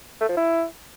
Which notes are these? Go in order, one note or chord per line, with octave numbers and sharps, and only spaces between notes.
A3
F3
E4